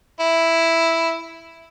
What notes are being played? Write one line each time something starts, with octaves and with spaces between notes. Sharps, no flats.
E4